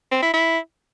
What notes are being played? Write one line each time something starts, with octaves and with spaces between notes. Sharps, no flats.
C4
E4
E4